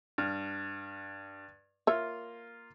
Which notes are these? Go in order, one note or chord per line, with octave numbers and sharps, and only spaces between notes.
G2 F6
A#3 F4 C#5 E5